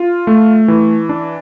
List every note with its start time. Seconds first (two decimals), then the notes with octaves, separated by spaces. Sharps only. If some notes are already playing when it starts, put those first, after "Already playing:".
Already playing: F4
0.27 A3
0.68 E3
1.09 D4